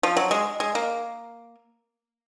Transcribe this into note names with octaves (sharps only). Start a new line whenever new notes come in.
F3
F#3
G#3
G#3
A#3